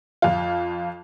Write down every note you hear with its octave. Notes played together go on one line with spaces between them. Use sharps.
F2 F4